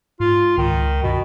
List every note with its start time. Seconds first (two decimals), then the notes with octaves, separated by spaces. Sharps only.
0.20 G#2 F4
0.58 C#2 D#3
1.03 G2 B2